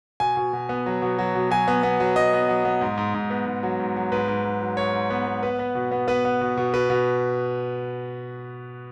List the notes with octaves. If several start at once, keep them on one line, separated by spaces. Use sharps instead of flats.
B2 G#5
B2
B2
B3
F#3
B2
F#3
B2
F#3 G#5
B3
B3
F#3
F#3 D#5
B3
F#3
B3
G#2
G#2
G#2
B3
G#2
F#3
G#2
F#3
G#2 B4
G#2
G#2
F#3
G#2 C#5
G#2
B3
B3
B3 B4
B3
B2
B3
B3 B4
B3
B2
B2
B2 B4
B2